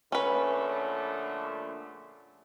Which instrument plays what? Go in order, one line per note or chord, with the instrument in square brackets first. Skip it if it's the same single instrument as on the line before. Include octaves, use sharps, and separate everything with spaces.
[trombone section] A#1 D3 A3 [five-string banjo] C#4 B4